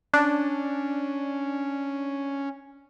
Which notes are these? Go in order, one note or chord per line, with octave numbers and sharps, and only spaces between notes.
C#4 D4